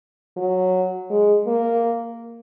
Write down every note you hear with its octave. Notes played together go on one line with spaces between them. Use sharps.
F#3
G#3
A#3